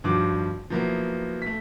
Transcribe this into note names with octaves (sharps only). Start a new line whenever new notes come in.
G2 D#3 F3 F#4 D6
F3 F#3 A#3 B3 E4
A3 B6